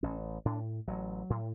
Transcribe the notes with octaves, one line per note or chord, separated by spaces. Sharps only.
A1 C#4
A2 D4
A1 F#3
A2